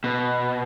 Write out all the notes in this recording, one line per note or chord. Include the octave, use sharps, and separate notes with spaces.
B2